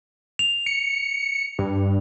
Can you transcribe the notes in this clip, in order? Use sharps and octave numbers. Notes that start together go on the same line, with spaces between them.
F7
C#7
G2